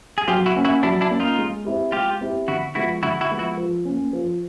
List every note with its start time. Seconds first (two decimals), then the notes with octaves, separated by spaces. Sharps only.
0.18 G#4
0.28 F#3 F4 G4
0.46 E4 F#4
0.56 A#3 C#4
0.65 E4 F#4
0.83 F#3 D4 E4
1.01 D4 E4
1.10 A#3 C#4
1.20 D#4 F4
1.38 G#3
1.65 C4 E4 G4
1.92 G#3 F4 G4
2.21 C4 E4 G4
2.48 D3 E4 F#4
2.75 F3 G#3 B3 E4 F#4
3.03 D3 E4 F#4
3.21 E4 F#4
3.31 F3 G#3 B3
3.39 E4 F#4
3.57 F3
3.85 A#3 C#4
4.13 F3